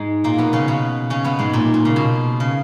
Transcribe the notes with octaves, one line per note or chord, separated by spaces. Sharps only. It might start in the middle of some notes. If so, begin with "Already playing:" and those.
Already playing: G#2 G#3
A#2 A#3
B2 B3
C#3 C#4
B2 B3
C#3 C#4
B2 B3
G#2 G#3
A#2
A#2
C#3
B2
C#3